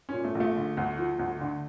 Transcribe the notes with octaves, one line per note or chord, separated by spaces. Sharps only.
C#4
A#2
A3
A#1
A3
D3
D2
F3
D2
D3